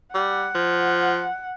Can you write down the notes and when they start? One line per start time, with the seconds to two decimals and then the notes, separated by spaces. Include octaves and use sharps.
0.15 G3 F#5
0.55 F3